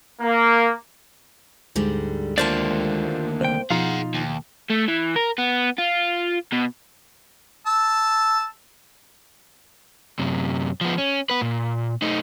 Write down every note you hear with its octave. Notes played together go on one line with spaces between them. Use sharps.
A#3
D2 G#2 D3 G3 G#3
D#2 A2 D3 A#3 F4 C5 D5 A5
C2 C5 G5
B2 F3 D#4 F4 G#4 F5 F#5
D#2
A3
E3
A#4
B3
F4
B2
A5 E6
F#2 C3
F3 B3
C#4
B3 B4
A#2
A3 D#4